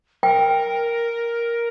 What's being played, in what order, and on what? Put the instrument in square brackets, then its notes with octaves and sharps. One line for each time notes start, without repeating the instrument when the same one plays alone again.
[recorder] A#4 [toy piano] G5